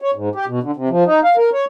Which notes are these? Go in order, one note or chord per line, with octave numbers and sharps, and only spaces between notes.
C#5
G#2
G4
B2
D3
C3
F3
D#4
F5
A#4
C#5